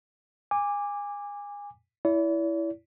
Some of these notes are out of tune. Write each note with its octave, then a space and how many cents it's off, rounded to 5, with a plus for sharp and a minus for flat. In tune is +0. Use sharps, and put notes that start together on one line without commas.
G#5 -25 D6 +0
E4 +0 D5 -45